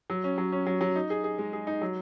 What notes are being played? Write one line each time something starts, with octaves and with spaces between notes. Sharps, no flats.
F#3
C#4
F#3
C#4
F#3
F#3
D#4
G#4
G#4
G#3
G#4
D#4
F#3